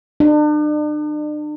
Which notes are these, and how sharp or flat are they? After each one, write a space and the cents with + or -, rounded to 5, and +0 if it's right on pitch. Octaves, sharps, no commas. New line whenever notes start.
D4 +40